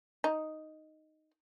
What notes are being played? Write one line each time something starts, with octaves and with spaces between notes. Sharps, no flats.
D#4